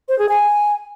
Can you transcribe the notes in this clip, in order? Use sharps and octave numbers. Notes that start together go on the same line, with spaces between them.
C5
G#4
G#5